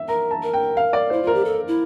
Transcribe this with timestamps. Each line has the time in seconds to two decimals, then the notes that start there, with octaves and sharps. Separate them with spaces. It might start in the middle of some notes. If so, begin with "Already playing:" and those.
Already playing: E5
0.08 A#4 A#5
0.31 A5
0.43 A#4
0.54 G5
0.77 F5
0.93 D5
1.10 E4 C5
1.23 F4 A#4
1.34 G4
1.45 A4
1.68 E4